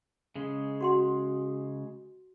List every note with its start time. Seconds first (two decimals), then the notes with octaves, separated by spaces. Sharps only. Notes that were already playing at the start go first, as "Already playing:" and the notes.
0.35 C#3 G#3
0.81 F#4 F#5 C6